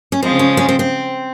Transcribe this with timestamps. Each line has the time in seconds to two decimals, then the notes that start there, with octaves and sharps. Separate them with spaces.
0.12 C#4
0.23 C#3 F3 G#3 C4
0.39 C#4
0.57 C#4
0.69 C4
0.79 C4